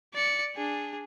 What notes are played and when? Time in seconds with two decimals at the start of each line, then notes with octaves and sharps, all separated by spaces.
0.14 D5 C#7
0.55 D4 G#4